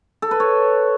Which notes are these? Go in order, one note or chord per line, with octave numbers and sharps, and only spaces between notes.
A4
B4
C#5